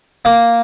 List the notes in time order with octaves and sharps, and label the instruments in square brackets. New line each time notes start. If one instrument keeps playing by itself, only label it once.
[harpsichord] A#3